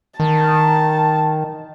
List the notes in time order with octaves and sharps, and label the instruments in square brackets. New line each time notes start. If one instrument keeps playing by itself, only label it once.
[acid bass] D#3 [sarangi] A5